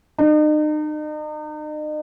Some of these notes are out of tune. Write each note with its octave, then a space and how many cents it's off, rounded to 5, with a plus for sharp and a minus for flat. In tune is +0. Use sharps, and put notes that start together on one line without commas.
D#4 -40